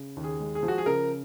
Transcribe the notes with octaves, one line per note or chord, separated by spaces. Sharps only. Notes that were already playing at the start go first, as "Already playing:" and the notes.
Already playing: C#3
D#2
G#4
G#3
G#4
F3
F#4
G#4
C#3 A#4